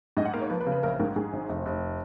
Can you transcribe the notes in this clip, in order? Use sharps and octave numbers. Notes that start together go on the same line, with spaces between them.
G#2 D#5
F#5
A#3 F5
C#5
F3 B4
B4
C#3
B4
A#1 A#4
G#2 A#4
G#2 G#4
G#1
F1
F1